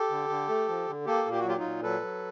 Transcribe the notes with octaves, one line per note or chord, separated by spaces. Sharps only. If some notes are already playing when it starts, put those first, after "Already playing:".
Already playing: G4 A4
D3
D3
A3
F3
D3
A#3 G4 A4
A#2
G4
F#4
F#3 F4 G4
D#4 F4
A#2
F#3 A4 B4
F#3